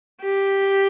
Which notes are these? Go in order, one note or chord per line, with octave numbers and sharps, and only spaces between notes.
G4